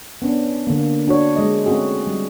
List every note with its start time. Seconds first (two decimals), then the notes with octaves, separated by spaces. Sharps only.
0.22 B3 C#4 D4
0.67 D3 A#3
1.07 D4 F#4 C#5
1.36 G#3 D#5
1.66 A3 C4 C#4 F#4 G#4
2.07 G3